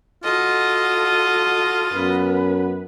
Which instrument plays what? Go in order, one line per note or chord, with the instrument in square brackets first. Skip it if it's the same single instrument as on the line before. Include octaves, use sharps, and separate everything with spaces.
[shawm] F4 [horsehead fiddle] F#4 A4 [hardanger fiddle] D#5
[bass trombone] F#2 [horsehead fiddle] B3 B4